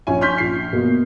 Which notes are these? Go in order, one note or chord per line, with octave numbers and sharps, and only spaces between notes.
A#1 C#4 C#5 G#5
C6 C#6 F6 G6 B6
A#1 C7
B2 A#3